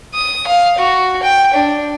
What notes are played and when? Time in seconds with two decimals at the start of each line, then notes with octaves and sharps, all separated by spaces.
0.14 D#6
0.47 F5
0.78 F#4
1.23 G5
1.54 D4